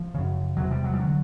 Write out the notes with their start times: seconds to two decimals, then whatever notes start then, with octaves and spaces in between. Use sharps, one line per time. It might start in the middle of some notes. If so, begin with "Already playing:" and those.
Already playing: F3
0.14 F#2 C#3
0.57 E2 C3 F#3
0.71 G3
0.84 F#3
0.94 G3
0.99 D3 F#3